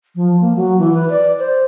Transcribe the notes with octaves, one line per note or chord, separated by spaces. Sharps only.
F3
A#3
F#3
E3
B4
D5
C5